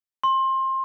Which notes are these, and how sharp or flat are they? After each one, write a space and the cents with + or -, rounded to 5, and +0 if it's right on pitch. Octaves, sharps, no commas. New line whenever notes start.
C6 +25